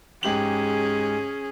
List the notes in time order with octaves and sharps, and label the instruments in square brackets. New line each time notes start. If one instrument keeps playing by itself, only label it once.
[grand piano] G#2 G4 F#7 [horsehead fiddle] C#4 G#4